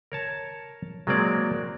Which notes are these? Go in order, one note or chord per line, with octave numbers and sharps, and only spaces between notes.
A#4 C#5 A5
F#3 G#3 A#3 C4 D5